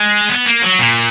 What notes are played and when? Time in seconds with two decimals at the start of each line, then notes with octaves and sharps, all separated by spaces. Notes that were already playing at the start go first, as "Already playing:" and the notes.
Already playing: G#3
0.29 B3
0.46 A#3
0.63 F#3
0.79 A#2